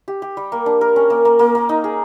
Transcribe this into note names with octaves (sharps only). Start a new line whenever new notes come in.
G4
G4
G3
A#3
D4
A#4
C#4
A#3
A#3
A#3
A#3
D#4
G#4